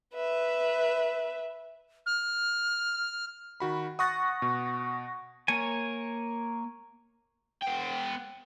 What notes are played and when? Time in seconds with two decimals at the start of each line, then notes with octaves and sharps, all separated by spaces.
0.14 B4 E5
2.06 F6
3.60 D#3 F#4 B5
3.99 F#5 C#6 D#6 F#6 A6 A#6
4.42 B2
5.48 A#3 C#5 G#5
7.62 B3 G5